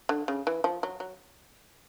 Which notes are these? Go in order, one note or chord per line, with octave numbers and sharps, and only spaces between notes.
D3
C#3
E3
F3
F#3
F#3